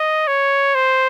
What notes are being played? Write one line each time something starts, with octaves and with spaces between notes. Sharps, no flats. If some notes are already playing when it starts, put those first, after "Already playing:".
Already playing: D#5
C#5
C5